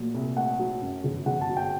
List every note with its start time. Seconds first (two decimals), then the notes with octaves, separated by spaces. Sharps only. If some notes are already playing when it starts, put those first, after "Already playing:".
Already playing: A#2 F#3 A3
0.14 C2
0.37 A3 F#5
0.59 F#3
0.81 F#2
1.04 G1
1.26 G1 F#5
1.41 A5
1.49 F#3
1.57 G5